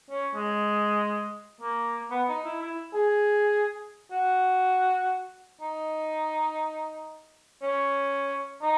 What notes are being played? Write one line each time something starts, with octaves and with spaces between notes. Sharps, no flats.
C#4
G#3
A#3
B3
D#4
E4
E4
G#4
F#4
D#4
C#4
D#4